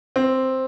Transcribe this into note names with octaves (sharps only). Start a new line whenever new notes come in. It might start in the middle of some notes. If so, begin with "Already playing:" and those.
C4